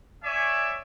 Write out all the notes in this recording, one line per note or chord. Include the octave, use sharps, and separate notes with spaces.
C#5 D5 E5 G#5